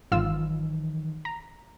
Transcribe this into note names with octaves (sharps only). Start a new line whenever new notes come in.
G#1 D#3 E3 F#3 F4 E6
A#5